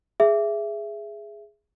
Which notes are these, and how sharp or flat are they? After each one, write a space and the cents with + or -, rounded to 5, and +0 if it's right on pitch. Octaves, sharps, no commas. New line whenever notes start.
G#4 +0 E5 +15